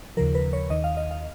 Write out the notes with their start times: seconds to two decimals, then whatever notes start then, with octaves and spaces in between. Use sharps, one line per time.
0.17 D#2 C#3 F3 A#4
0.35 B4
0.53 C#5
0.70 D#2 D#3 D#5
0.84 F5
0.97 D#5
1.11 F5